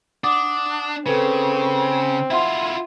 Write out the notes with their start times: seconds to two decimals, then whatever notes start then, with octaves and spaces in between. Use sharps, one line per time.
0.24 D4 F#5 D6 D#6
1.06 C#3 C4 A4 B4
2.31 E4 F4 E5 F#5 C6